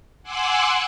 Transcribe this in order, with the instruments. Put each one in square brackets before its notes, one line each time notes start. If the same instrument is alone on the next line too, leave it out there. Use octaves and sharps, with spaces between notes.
[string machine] F#5 G#5 C6 D6 E6 F#6